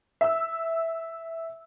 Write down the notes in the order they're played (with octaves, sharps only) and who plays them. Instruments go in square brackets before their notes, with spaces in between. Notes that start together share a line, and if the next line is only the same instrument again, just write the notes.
[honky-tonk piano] E5 E6